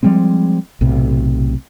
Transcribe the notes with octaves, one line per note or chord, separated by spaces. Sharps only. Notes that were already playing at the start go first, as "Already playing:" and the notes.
F3 G3 G#3 C4
B1 A2 C3